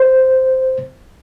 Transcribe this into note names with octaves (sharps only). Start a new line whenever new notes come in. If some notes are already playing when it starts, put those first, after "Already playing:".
Already playing: C5